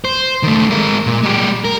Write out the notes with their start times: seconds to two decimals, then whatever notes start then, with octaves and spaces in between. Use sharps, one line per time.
0.05 C5
0.43 D#3 A3
0.70 G#3 A#4
1.07 A#2
1.23 G#3 G4
1.65 A#4